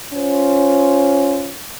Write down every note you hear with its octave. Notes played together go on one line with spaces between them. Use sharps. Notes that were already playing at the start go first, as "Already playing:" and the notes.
C#4 F4 C5